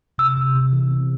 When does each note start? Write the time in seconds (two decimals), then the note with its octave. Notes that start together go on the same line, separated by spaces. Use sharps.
0.18 C3 E6
0.37 C3
0.55 C3
0.72 E3
0.91 C4